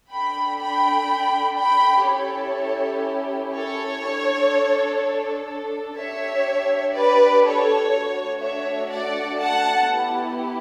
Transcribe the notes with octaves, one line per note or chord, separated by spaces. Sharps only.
D4 A4 G5 B5
G5 B5
G5 B5
C#4 E4 G4 A4 C#5
A4 C#5
D4 A4
D4 G4 C#5 E5
B4 D5
A4 C#5
A3 D4 F#4 A4
C#5 E5
D5 F#5
F#5 A5
B3 E4 G4